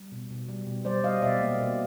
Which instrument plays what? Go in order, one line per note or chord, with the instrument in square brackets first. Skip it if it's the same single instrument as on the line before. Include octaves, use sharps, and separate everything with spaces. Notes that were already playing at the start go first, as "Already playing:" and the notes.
Already playing: [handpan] G3
B2
B2
G3
B2
G3 C5 D5
G3 D#5 F5
B2 D5 E5
A#3
B2